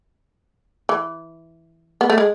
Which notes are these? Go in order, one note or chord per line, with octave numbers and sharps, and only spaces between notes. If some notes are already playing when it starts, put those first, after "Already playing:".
E3
B3
A3
G#3